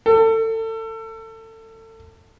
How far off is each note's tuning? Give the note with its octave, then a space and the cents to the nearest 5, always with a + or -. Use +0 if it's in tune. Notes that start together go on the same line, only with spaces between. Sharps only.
A4 +30